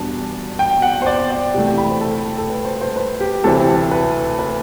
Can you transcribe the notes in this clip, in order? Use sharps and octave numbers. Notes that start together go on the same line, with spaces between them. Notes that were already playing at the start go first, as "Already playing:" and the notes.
Already playing: E2 B2 G3 D4 A5
G5
F#5
C5
D5
D5
C3 E3 A3
G5
B5
C5
A4
A4
B4
C5
C5
B4
G4
D2 C3 E3 A3 C4 A4
B4
B4